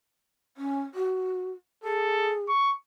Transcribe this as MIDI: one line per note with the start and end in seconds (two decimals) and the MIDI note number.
0.57 0.81 61
0.94 1.52 66
1.84 2.47 68
1.84 2.34 69
2.48 2.73 85